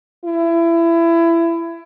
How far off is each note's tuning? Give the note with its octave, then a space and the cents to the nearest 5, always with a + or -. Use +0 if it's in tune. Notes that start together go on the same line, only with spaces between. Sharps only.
E4 +25